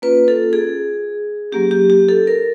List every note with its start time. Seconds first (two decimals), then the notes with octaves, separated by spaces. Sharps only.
0.02 A#3 C#4 F4 B4
0.28 A4
0.53 G#4
1.52 F#3 A#3 C#4 G4
1.71 G4
1.90 G4
2.09 A4
2.27 A#4